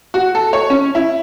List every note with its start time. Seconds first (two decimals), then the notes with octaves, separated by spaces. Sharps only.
0.14 F#4
0.35 A4
0.53 C#5
0.70 C#4
0.95 E4